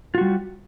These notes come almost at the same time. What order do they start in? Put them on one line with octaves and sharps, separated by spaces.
F4 F#4 G3